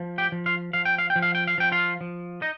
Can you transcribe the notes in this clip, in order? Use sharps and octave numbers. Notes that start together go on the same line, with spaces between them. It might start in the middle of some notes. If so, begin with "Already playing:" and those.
Already playing: F3
G4 G5
F3
F4 F5
F3 F5
G5
F5
G5
F3
F5
G5
F5
F3 G5
F4 F5
F3
D#4 D#5